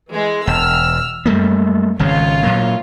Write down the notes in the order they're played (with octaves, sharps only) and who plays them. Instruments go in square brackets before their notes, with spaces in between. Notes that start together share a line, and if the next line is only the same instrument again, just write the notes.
[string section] E3 G#3
[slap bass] E1 [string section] E6 F6
[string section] F#2 [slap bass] G3 A3 A#3
[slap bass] G#1 C#3 G#3 [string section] F4 C#5
[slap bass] A#2 F#3 A#3